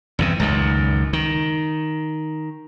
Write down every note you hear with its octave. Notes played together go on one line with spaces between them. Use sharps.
E2 G2 C3
C#2 F#2 D#3
D#3